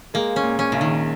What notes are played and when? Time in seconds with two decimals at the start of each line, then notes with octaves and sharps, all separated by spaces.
0.14 G#3 A#3
0.36 C#4
0.43 A#2
0.59 C#4
0.72 A#1 C#3
0.81 D#3